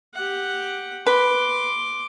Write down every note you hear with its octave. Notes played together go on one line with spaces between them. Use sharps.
G4 F#5
B4 C6 D6